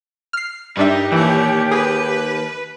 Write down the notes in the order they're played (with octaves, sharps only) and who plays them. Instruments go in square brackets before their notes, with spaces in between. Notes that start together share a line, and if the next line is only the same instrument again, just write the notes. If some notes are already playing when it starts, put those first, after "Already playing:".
[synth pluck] F6 C7
[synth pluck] G2 D4 E5 [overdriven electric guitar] D#4 [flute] G4 [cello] A#4
[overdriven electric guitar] D#2 [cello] A#2 C#5 [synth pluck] E3
[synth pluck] G#4 [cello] B4